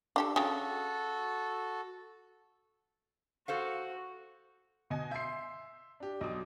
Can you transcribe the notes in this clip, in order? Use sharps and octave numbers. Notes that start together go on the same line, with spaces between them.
D4 G4 A4
C#3 F#4 A4 G5
F#4 A4 C5 F5
B2 D#5 G#5
E5 C6 G6 C7
D4 G4
B1 D#5 D6 D#6